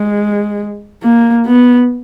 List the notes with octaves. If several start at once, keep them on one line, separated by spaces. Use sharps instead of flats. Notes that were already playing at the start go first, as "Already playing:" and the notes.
Already playing: G#3
A#3
B3